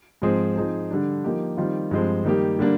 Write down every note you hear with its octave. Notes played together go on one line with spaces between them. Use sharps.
G#2 F3 C4 D#4 G#4
F3 C4 D#4 G#4
D3 G3 D4
F3 A#3 D#4 G4
D#3 G3 C4 F4
G2 F3 G#3 C4
D#3 G3 A#3 D#4 G4
D3 G3 A#3 D4